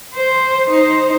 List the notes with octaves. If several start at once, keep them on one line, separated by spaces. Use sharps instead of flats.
C5
D#4 C5